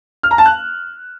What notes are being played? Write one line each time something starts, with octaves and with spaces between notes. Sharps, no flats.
F6
A#5
A5
F#6